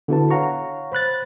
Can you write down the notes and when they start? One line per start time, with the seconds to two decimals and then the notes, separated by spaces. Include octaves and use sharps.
0.08 D3 B3 E4 F#4 B4 A5
0.30 C#5 F5 F#5 A#5 C#6
0.92 C5 B5 F#6 A6